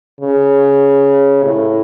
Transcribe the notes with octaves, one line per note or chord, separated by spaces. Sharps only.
C#3
A2